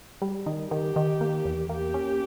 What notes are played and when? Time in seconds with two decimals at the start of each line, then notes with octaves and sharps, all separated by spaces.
0.22 G3
0.46 D#3
0.71 D#3 G4
0.96 D#3
1.21 A#3
1.45 E2
1.69 A#3 G4
1.94 C#4